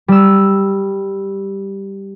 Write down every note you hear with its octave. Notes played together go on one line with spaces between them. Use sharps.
G3 E6